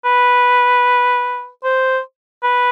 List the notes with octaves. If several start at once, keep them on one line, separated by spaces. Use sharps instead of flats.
B4
C5
B4